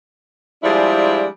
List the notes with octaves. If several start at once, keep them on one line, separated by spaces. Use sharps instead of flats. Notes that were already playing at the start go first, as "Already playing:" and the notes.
F3 G3 G#3 D4 E4 G#4